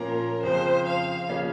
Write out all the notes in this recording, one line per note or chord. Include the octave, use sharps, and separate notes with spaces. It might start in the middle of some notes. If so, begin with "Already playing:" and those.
Already playing: A#2 F3 A#3 C#4 A#4
F2 C#3 F3 C5
F5
C#3 F3 A#3 C#4